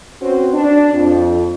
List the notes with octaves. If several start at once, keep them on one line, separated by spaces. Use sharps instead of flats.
C4 C#4 F#4 B4 C5
D4
F2